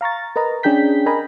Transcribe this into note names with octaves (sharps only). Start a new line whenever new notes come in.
F5 A#5 C#6 A6
A#4 B4 D#5 A#5
C#4 D4 G#4 G5 G6 B6
A#4 D#5 G#5 A#5 B5